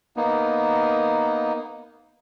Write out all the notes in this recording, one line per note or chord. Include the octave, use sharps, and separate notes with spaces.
A#3 B3 D#4